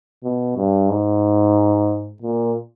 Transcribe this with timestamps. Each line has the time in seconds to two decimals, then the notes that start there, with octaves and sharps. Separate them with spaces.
0.24 B2
0.57 G2
0.90 G#2
2.22 A#2